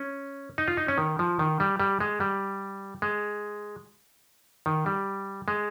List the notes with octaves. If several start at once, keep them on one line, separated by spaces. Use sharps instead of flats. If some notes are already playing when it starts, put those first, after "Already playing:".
Already playing: C#4
D#4
F4
D#4
C#4
D#3
F3
D#3
G3
G3
G#3
G3
G#3
D#3
G3
G#3